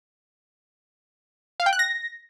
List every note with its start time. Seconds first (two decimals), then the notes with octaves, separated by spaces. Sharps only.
1.60 F5
1.66 G5
1.73 F#6
1.79 A#6